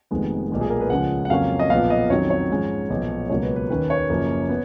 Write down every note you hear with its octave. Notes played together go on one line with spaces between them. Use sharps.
F1 F2 D#3 G#3 B3
B1 A#2 G#3 B3
G#4
A#4
B4
C#2 C#3 F3 G#3 F#5
F#5
F2 C#3 F#3 A#3 C#4 F5
D#5
B1 A#2 F3 B3 F5
D#5
F2 D#3 F#3 C#4 C#5
C#5
G#2 F3 G#3 C#4
B1 A#2 F3 B3
C#2 B2 F#3 A#3 C#5
B4
B4
D#2 D#3 A#3 C#4 B4
C#5
F#1 F#2 C#3 F3 A#3
B3